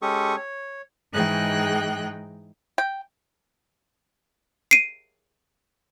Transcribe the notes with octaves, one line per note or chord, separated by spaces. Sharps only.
G#3 C#4 G4 A4 C#6 D#6
C#5
G#2 E3 D#4 G#4 G5 F#6
G5
C7 D7 D#7